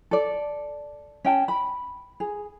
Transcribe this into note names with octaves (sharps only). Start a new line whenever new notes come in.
A4 D5
C#4 G5 A5
B5
G#4